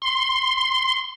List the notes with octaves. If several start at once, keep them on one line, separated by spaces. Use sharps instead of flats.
C6